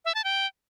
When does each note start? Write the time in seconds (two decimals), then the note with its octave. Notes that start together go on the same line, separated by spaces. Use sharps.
0.05 E5
0.15 A5
0.24 G5